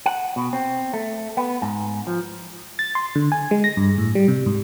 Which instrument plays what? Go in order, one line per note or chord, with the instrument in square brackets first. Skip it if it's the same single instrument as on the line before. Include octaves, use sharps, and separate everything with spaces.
[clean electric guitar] F#5
B2
C4
A3
B3
G#2
F3
[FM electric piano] A6
C6
D3
G#5
G#3
A#6
G2
A2
G3
C3
G#2